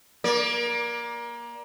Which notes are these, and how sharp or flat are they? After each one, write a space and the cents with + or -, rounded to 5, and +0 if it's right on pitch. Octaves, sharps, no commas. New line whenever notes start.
A#3 +25 D5 +0